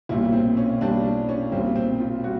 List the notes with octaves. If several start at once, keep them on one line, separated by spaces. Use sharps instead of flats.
B1 A#2 G3 E4
C4
C#4
B1 A#2 G3 D4
D4
C#4
B1 A#2 G3 C4
C4
F4
G3 F#4